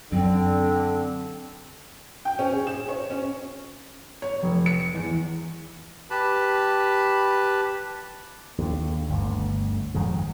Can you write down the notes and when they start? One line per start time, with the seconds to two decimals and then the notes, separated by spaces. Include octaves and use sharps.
0.12 F#2 D3 C4
2.25 G5
2.39 C#4
2.53 G#4
2.67 E7
2.89 C#5
3.10 C#4
4.22 C#5
4.43 F1
4.66 C#7
4.95 E2
6.10 G4 B4 A5 B5
8.58 D#2 D3
9.09 G1 D2
9.94 G#1 F2 D#3 G#3